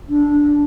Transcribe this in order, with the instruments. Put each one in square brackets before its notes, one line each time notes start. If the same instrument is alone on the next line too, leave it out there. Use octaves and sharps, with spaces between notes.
[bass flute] D4